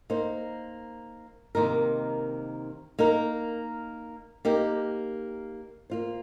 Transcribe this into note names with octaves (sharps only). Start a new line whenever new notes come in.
A#3 D#4 C5
C3 D#3 A#3 D#4 A#4
A#3 D#4 A#4
A#3 D#4 G4 A#4
A#3 F4 C5